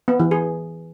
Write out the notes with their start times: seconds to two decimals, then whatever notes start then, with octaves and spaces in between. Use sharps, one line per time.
0.08 B3
0.20 E3
0.31 G#4